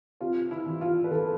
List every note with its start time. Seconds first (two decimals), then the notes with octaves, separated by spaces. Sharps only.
0.20 C3 F4
0.51 E4
0.67 E3
0.81 F4
1.04 B4
1.11 E3 A4